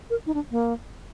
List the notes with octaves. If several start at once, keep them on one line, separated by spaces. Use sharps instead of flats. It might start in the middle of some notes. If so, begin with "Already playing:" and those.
A#4
D#4
D4
A#3